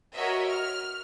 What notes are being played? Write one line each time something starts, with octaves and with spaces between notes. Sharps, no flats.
F#4 A#4 C#5 D#5 E5
F6